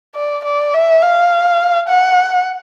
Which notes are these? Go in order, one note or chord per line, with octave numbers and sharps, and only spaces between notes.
D5
D5
E5
F5
F#5